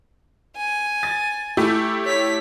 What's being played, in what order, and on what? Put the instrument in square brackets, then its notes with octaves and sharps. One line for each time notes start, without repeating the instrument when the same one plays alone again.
[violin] G#5
[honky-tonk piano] A6
A3 E4 G4
[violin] C#5 B6